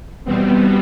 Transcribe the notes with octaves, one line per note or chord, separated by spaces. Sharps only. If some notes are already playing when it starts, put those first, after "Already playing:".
E2 B2 G3 B3 C4